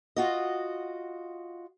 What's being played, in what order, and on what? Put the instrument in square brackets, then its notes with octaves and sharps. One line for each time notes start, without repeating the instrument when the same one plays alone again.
[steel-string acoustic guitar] F4 F#4 D#5